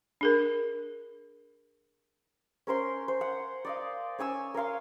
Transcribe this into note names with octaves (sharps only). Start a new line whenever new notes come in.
D4 G#4 A#4
C#4 A#4 C5 C6
C5
F#5
D5 D#5 F5
C#4 C#5 G#5 E6
A#4 C#5 F5 C6